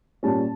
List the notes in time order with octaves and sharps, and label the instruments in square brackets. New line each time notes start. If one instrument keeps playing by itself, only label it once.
[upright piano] A#2 G3 C#4 A5